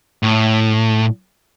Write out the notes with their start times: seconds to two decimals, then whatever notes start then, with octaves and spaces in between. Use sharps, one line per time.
0.23 A2